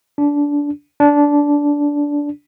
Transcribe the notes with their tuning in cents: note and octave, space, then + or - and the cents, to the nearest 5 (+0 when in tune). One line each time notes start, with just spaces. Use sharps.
D4 -20
D4 -15